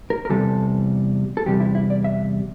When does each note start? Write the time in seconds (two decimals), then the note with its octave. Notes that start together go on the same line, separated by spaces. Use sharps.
0.10 A#4
0.25 A#4
0.30 E2 C3 E3 G3 A4
1.37 A4
1.46 E2 C3 G3 G4
1.60 E4
1.75 E4
1.90 D5
2.04 E5